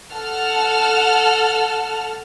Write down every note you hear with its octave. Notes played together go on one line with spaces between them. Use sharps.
A4 F#5 A5 F6